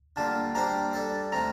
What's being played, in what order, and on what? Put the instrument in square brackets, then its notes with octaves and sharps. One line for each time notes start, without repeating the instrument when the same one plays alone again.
[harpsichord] D3 G3 A#3 F4 [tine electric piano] A5
[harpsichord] G3 A#3 D4 G4 C5 [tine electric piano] A#5
[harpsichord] G3 D4 A4
[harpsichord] D#3 A3 C4 [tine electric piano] A#5